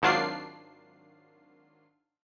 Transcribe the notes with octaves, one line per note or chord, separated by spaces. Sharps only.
G#1 D#3 F#3 D4 F4 C7